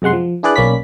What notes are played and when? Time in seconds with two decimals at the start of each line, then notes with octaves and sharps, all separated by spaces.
0.02 F#2 C3 G#3 F#5 C6
0.13 F3
0.43 D4 E4 G#4 B4 D5 F#6
0.56 B1 A#3 C#4 D5 B5 B6